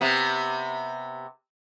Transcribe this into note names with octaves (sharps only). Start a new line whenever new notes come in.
C3 B3